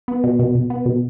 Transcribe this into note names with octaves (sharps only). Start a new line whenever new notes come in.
B3
B2
B2
B2
B3
B2